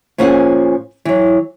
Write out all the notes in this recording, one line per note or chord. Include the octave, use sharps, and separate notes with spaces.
A#2 F3 C#4 E4 G#4 F#5
E3 F#3